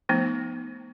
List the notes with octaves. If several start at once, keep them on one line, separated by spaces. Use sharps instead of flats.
F3 A3 B3 D#4